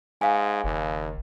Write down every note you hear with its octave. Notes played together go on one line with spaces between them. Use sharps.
G#2 F5 G#5
F#1 D#2